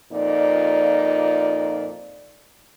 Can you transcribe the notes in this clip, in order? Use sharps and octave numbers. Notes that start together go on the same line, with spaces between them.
F2 A#2 D#4 D5